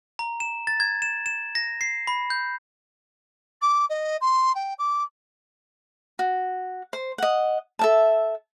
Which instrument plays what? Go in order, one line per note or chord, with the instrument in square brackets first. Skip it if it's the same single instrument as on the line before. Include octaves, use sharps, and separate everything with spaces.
[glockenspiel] A#5
E7
A6
G#6
E7
E7
A#6
C7
B5
G6
[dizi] D6
D#5
C6
G5
D6
[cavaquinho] F#4
C5
D#5 F#5
A4 E5 A5